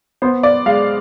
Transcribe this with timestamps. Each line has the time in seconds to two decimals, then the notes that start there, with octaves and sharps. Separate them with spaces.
0.22 B3 C5
0.43 D5
0.66 G#3 F5